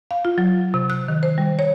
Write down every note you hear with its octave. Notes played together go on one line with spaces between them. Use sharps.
F5
F4
F#3
C3
F#6
D#3
C5
G3
C#5